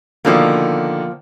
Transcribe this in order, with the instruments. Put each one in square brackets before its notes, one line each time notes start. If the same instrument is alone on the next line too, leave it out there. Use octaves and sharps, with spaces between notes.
[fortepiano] B2 D3 D#3 [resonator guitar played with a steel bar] F3 A#3